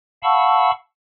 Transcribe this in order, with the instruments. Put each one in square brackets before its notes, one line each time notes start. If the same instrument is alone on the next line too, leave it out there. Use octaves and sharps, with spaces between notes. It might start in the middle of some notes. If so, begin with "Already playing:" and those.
[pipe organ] F5 F#5 A5 B5 C#6 E6